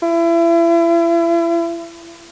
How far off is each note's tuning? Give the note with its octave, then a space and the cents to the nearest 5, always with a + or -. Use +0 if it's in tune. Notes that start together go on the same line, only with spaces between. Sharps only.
E4 +35